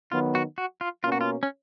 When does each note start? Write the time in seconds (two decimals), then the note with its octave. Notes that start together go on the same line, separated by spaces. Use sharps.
0.11 D#3 F#3 B3 F4
0.35 F#4
0.58 F#4
0.81 F4
1.03 B2 A#3 C#4 F4
1.12 F#4
1.21 F4
1.43 C#4